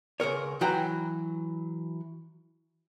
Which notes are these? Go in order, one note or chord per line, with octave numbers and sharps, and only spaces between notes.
C#2 B2 A#4 C#5
E3 F#3 F#4 G5 A#5